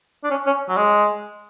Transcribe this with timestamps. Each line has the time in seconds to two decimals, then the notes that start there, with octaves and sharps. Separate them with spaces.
0.24 D4
0.31 C#4
0.47 C#4
0.69 F#3
0.77 G#3